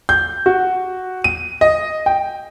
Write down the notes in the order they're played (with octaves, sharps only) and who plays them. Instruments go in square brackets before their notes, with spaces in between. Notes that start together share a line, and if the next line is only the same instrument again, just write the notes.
[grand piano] G6
F#4
D#7
D#5
G5